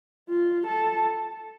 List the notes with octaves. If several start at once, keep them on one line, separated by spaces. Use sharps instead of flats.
F4
A4